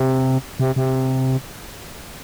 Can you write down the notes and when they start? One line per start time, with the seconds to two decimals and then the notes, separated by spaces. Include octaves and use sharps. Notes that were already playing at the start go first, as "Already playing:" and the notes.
Already playing: C3
0.59 C3
0.76 C3